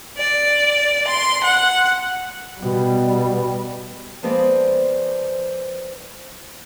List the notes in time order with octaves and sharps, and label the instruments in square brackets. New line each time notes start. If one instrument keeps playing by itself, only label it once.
[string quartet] D5
C6
F#5
[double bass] B2 G3
[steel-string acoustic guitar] F3 G#3 B3 C4 C5 D5